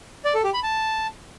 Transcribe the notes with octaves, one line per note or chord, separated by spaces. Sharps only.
D5
A4
G4
B5
A5